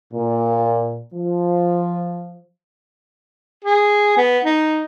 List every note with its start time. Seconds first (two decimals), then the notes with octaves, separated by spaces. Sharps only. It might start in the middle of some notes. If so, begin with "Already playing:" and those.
0.13 A#2
1.13 F3
3.64 G#4
4.17 B3
4.44 D#4